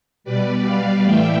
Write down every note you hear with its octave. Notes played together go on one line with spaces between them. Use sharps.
B2 G3 B4 D5
D5 F5
A2 E3 A3 E5 G5